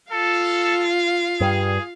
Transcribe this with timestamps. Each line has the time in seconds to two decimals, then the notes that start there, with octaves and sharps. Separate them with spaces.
0.12 F4 A4 F5
1.40 G2 G3 G#4